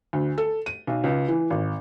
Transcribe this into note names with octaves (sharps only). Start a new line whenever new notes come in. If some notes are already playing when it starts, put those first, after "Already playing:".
D2
A4
D#7
B1
C#2
E3
G#1